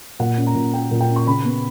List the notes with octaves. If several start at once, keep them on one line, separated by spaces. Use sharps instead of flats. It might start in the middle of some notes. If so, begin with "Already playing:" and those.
A#2 F#5
C#4
A#5
A#2
A#3 G5
A#2
G5
C#4
C#6
C#3 B5
B3